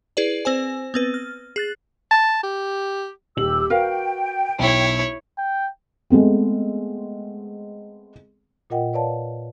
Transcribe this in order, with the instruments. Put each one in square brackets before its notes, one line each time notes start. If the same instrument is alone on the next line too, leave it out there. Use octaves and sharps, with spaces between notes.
[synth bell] E4 G#4 B4 D5
C4 C5 G#5
B3 C4 B4
F6
G#4 F#6 A6
[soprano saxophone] A5
G4
[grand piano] D#1 F#7 [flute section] G4 E6
[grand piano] F#4 [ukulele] A#4 B4 F5 [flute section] G5
[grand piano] B1 [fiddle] E4 C#5
[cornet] G5
[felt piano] G#3 A3 B3 C4
[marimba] A#2 F4 A#4 D#5 F#5 G5
B4 C#5 D5 F5 A5